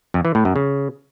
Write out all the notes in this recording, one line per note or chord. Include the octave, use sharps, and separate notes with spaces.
F2
E3
A2
F#2
C#3